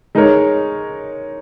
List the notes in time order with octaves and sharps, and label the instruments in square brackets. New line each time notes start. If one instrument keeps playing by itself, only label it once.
[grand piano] G#3 D#4 A#4 C#5